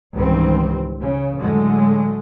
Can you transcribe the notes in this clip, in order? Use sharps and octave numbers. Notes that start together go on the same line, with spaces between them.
C#2 G#2 D#3 E3 G3 C4
C#3
A2 D3 F#3 G#3 A3